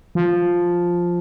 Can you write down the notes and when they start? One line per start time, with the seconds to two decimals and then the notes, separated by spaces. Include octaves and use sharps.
0.15 F3